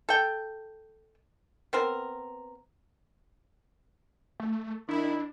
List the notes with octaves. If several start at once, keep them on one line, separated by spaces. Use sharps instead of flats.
A4 G5
B3 C4 A#4
A3
D#3 D4 E4